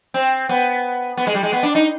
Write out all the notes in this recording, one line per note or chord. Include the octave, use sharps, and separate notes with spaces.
C4
B3
B3
G#3
G3
G#3
B3
D4
D#4